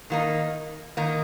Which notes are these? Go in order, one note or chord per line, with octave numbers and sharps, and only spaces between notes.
D#3 A#3 D#4
D#3 A#3 D#4